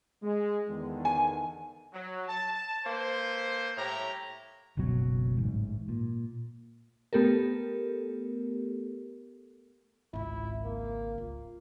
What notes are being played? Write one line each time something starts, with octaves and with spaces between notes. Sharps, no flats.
G#3
E2 D3 D#3
G#5
F#3
A5
A#3 A4 B4 C5
A2 G3 E4 G4 C#5 A#5
F#1 C#2 B2 F#3
A1 G#2
A#2
A3 B3 G4 A4 A#4
G#1 C#2 E4
A#3
F4